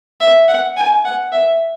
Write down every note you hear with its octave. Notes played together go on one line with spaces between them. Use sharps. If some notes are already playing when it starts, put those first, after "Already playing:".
E5
F#5
G#5
F#5
E5